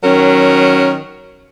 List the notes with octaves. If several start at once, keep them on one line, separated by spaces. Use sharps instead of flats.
D#3 F#3 C#4 A#4